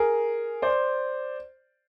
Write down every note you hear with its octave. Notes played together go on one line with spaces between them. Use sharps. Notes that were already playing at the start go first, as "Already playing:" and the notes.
Already playing: G#4 A#4
C5 D5